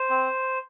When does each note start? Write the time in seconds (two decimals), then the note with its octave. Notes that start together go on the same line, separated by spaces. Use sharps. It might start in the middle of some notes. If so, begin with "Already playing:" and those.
Already playing: C5
0.10 C4